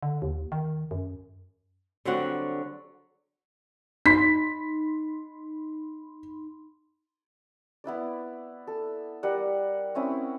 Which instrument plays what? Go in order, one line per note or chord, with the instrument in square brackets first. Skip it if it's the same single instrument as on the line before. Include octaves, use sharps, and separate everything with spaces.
[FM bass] D3
D#2
D#3
F#2
[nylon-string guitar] D3 F#3 G3 C4 F#4
[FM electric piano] D#4 B5 C6 [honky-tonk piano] B6
[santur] B3 E4 B4 D5
A4
G3 A#4 F#5
C4 C#4 E4 D#6